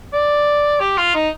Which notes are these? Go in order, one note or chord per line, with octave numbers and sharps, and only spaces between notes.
D5
G4
F4
D#4